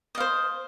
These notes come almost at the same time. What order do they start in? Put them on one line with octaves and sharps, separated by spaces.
D#5 F5 C5